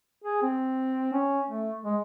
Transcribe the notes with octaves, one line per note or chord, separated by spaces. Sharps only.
G#4
C4
C#4
A3
G#3